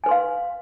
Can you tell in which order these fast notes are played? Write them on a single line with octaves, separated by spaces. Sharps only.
G#5 B4 C6 F5